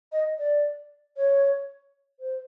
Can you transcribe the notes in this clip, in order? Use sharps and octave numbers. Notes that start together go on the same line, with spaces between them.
D#5
D5
C#5
C5